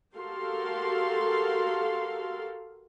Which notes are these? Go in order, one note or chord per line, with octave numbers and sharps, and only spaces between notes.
F#4 G4 A4 A#4 F5 C6